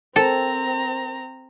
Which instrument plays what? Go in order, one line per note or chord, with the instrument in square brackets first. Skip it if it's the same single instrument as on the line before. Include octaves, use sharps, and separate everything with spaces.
[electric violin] C4 A#5 [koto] A4 [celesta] A#4 C5 G5